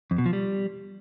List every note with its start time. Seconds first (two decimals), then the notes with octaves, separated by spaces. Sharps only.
0.11 F2
0.18 B2
0.26 F3
0.33 G3